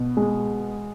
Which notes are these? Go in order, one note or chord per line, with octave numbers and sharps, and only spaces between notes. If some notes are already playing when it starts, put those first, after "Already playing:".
Already playing: B2
G#3